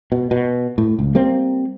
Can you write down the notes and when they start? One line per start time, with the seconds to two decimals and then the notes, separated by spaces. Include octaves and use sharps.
0.12 B2
0.31 B2
0.78 A2
0.99 C#2
1.15 G3 A#3 C4